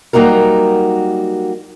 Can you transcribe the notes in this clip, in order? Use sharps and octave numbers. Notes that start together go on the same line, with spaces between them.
F#3 G3 A#3 D#4 F#4 A#4